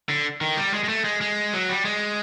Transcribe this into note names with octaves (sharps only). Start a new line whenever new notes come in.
D3
D#3
G3
G#3
G#3
A3
G#3
G#3
F#3
G3
G#3